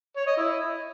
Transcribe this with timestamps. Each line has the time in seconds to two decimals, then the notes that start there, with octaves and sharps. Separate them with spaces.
0.17 C#5
0.27 D#5
0.37 E4